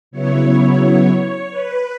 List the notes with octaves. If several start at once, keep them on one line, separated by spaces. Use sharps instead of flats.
C#3 F#3 B3 E4 C#5
B4